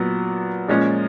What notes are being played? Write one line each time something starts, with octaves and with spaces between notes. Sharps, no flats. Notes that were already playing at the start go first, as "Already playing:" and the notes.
Already playing: A#2 F#3 B3
A#2 F3 G#3 C#4